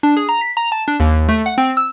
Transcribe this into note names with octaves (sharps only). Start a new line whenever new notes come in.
D4
G#4
A#5
B6
A#5
A5
D4
D#2
A3
F#5
C4
E6